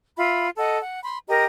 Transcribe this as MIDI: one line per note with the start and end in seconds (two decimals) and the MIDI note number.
0.17 0.48 65
0.17 0.48 76
0.17 0.48 83
0.57 0.78 69
0.57 0.78 75
0.57 0.78 78
0.81 1.01 78
1.02 1.18 83
1.02 1.18 84
1.28 1.45 67
1.28 1.45 70
1.28 1.45 75
1.28 1.45 82